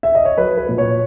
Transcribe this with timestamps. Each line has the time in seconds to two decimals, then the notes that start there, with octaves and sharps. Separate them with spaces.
0.03 E5
0.15 D#5
0.25 C#5
0.37 F#3 B4
0.58 B4
0.69 A#2
0.78 C#5